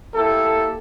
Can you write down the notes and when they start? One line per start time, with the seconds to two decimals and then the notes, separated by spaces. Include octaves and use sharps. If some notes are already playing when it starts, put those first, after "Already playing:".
0.14 A#3 E4 G4 A4